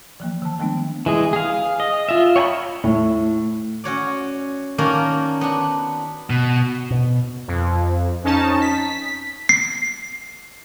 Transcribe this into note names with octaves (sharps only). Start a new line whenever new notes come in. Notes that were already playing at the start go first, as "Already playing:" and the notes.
E3 F3 A#3
D#3 A5
D#3 F3 G#3 A3 B3 D4
E3 G#3 G#4
G#4 F5
D#5
F4 E5
C#5 G5 G#5 A#5 B5
A2
C#4 F#4 C#5 D5
D#3 A#3 C#4 D4 F#4 A#4
B3 D4
B2
B2
F2
F2 C#4 D#4 A5
B6
C7